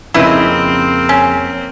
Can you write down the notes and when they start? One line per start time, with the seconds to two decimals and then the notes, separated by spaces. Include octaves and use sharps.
0.14 F2 C#3 A#3 C4 D#4 E4 B4 D#5
1.09 C#4